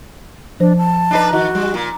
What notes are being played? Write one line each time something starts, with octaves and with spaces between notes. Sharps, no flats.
F3 D4 C5
A5
D4 D#4 B4
D#3 F#4
G3
A#2